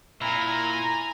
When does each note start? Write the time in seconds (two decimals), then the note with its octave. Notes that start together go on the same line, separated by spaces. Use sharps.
0.21 A#2 E4 G#5 A#5